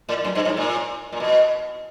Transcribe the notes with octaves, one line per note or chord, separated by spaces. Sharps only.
A2
F#2
G2
G#2
A#2
A#2
B2